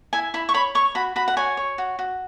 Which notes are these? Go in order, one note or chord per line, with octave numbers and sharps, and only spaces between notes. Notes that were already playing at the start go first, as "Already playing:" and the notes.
E4 G#5
E4 B5
C#6
C#5 B5
C#5 C#6
F#4 B5
F#4 B5
F#5
C#5 G#5
C#5
F#4
F#4